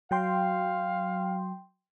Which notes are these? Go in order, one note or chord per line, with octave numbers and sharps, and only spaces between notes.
F#3 F5 G5 C6